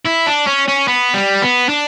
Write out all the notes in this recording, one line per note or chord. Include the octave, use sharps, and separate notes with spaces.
E4
D4
C#4
C#4
B3
G3
B3
D4